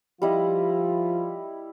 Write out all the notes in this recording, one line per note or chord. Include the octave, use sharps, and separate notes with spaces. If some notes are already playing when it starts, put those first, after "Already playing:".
F3 G3 E4 F4 D#5